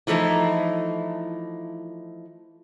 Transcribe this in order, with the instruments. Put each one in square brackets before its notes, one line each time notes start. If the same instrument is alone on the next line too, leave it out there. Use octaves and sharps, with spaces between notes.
[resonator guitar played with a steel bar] E3 F3 A3 D#4 E4